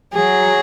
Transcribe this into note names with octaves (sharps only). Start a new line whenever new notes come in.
F#3 G#4